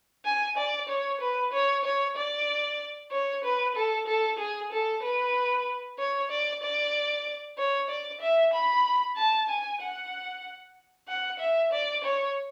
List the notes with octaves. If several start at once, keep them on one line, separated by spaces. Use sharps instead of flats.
G#5
D5
C#5
B4
C#5
C#5
D5
C#5
B4
A4
A4
G#4
A4
B4
C#5
D5
D5
C#5
D5
E5
B5
A5
G#5
F#5
F#5
E5
D5
C#5